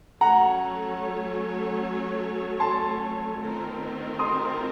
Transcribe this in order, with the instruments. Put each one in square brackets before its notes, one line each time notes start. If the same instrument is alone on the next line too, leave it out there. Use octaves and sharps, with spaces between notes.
[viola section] F#3 A3 C#4 A4 C#5 [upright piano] F#5 A#5
[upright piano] A5 C6
[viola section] D#3 A3 C4 F4 A#4
[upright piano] C6 D#6